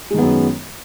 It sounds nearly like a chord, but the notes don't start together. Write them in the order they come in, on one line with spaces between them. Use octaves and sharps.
G#3 D#3 B3 F#2